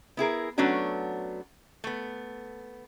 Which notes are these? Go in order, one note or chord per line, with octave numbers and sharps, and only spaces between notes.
B3 E4 G#4 A#4
F#3 A3 B3 C#4 D4 F#4
A3 B3